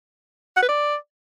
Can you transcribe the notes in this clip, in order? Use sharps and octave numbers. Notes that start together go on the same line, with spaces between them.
F#5
B4
D5